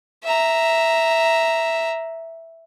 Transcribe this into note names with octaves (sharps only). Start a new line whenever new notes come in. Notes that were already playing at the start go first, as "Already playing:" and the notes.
E5 A#5